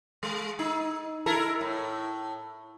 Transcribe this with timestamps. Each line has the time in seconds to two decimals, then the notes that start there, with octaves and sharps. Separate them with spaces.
0.23 G#3
0.59 D#4
1.26 E4 A4 A#4
1.61 A2